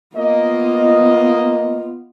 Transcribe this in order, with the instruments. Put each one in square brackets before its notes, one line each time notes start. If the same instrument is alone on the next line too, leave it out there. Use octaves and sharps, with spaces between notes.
[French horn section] A#3 D#5 [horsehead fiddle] B3 F4